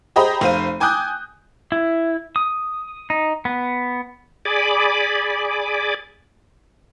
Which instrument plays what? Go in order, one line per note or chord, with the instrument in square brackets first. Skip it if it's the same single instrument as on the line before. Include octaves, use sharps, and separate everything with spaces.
[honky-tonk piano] G4 G#4 C5 D#5 A#5 B5
F1 C5 F5 D#7
G5 G#5 D6 D#6 F#6 G6
[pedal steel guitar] E4
D#6
D#4
B3
[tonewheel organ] G#4 D5 G#5 B5 D6